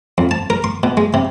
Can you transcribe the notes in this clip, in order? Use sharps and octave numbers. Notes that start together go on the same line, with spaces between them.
F2
A5
A#4
C6
B2
G#3
C3